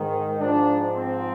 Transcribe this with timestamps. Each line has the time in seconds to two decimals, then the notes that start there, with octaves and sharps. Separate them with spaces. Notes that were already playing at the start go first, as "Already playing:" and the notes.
Already playing: G#2 D#3
0.39 G#2 F3 D4
0.93 C4